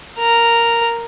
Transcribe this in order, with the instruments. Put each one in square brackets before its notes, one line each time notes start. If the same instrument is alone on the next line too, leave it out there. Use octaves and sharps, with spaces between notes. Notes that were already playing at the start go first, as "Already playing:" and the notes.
[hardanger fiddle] A#4